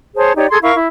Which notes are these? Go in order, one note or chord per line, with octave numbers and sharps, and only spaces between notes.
G#4 C5 C#5 A5
D#4 G4 C#5 D5
G#4 A4 C6 G#6
E4 A#4 F5 C#6
E4